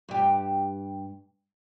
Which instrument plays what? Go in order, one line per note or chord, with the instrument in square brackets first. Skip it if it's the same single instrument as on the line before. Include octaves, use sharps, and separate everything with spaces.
[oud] G2 G4